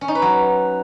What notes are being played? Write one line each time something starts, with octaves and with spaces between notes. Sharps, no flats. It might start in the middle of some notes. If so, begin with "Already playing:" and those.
C#4
D#4
B4
F#3